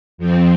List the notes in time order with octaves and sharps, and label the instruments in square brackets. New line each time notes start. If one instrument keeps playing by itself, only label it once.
[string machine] F2 F3 C4